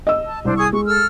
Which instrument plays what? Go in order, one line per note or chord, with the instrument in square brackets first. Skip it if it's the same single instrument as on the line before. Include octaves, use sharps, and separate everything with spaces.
[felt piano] D#5 E6
[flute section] A5
[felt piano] C2 [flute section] D4 C5
[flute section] G#4 C#6 D#6
[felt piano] G#3 [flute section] C#6
[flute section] A4 E6 F6